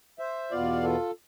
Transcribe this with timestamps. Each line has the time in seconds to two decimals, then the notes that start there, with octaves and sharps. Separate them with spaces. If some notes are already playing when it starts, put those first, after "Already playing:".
0.19 C5 E5
0.51 E2 B2 B3 F4 D5 F5
0.83 F4 A4